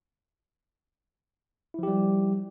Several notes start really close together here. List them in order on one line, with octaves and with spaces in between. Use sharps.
E4 F3 G4 G3